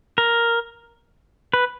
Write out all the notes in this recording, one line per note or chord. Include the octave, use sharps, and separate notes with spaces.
A#4
B4